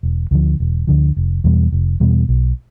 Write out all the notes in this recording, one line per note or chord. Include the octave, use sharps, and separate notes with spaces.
E1
D2 D3 F3
E1
D2 D3 F3
F1
E2 B2 G3
F1
E2 B2 G3
B1